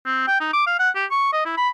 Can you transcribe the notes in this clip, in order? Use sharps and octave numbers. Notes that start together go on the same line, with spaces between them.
C4
G5
D#4
D6
F5
F#5
G4
C#6
D#5
E4
B5